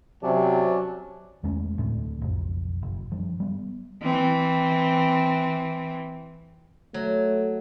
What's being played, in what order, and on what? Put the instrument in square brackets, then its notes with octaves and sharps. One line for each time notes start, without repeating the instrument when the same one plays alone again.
[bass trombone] C3 [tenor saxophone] F#3 [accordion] C#4 D5 A5
[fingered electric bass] E2 G#3 A3 C#4
D2 A2 A3 C4
F#1 B1 F2 F3
F#1
G2 F3
G3 B3
[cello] E3 C4
[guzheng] F#3 [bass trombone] A3